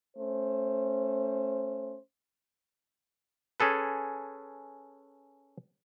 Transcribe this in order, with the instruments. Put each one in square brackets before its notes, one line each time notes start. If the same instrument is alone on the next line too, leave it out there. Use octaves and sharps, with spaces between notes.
[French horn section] A3 C#4 C5
[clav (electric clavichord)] C#4 G#4 A4 B4